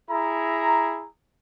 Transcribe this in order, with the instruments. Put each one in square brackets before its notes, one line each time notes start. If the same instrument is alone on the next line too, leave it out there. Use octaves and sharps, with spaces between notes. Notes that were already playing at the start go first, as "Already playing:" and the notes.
[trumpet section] E4 G#4 A#5